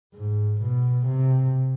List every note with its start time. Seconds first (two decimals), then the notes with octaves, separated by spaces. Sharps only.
0.14 G#2
0.61 B2
1.07 C3